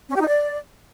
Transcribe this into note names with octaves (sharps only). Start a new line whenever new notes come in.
C#4
G4
D#4
D5